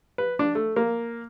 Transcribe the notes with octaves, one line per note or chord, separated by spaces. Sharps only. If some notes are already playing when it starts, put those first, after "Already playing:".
B4
D4
A3
A#3